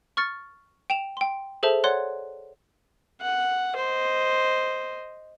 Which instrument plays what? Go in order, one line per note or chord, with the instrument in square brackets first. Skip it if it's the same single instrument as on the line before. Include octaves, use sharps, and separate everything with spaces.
[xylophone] C#6 F6 A6 C#7
G5 E7 F7
G5 C6
G#4 A4 C5 E5 A5
C#5 D5 F#5 C6 F#6
[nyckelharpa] F#5
C5 D#5